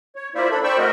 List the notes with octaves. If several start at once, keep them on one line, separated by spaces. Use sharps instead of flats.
C#5
A#3 E4 F4 C5 D5 E5
D4 A4 B5
C5 D5 G5 B5 C#6 E6
A3 C4 F#4 A#4 D#5 E5